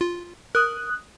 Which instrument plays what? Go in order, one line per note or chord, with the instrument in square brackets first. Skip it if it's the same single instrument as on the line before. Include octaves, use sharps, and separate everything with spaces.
[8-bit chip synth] F4
[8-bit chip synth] A#4 [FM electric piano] D#6 F#6